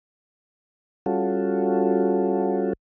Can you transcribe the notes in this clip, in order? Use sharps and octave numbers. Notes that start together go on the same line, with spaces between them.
G3 C#4 F4 F#4 A4